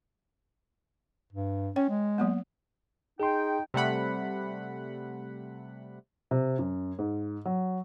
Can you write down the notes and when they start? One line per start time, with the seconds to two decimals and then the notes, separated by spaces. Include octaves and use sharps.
1.33 G2
1.76 C#4 C#5 G5
1.90 G#3
2.18 F#3 A#3 B3
3.20 D#4 G#4 G5 C6
3.74 C3 G3 A3 F#5 B5
6.31 C3
6.59 F#2
6.99 G#2
7.45 F#3